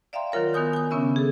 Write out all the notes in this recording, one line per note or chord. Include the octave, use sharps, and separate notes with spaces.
D5 E5 F5 G5 A#5 C6
D#3 F#3 F4 A#4 C#5
D#3 B3 F#4 G#5 D#6 G6
G#5 D#6
C#3 B3 C#4 D4 E5 E6
G#4 A4